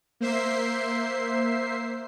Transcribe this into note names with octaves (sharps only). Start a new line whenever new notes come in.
A#3 C5 E5 C7